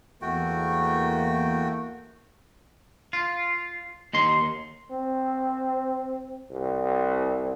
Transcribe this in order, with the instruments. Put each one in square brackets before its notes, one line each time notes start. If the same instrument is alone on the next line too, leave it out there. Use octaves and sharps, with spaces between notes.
[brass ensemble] E2 A#3 [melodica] A3 F#4 G5
[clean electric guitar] F4
D#2 D#4 C6
[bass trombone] C4
C2